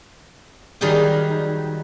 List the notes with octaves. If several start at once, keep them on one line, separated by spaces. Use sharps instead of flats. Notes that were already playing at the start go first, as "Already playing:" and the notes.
D#3 F#3 G3 G#4 G5